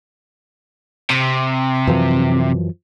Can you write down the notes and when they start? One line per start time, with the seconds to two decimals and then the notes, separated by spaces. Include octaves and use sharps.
1.10 C3
1.87 F#2 E3 F3